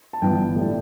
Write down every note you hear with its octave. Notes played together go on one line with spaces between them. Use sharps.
A5
G1 G2 E3 B3 G5
A2 G3 D4